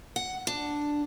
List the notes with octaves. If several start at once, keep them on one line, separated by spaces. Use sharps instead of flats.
F#5
D4